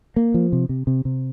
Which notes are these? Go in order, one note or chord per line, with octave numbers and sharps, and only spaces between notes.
A#3
F3
C3
C3
C3
C3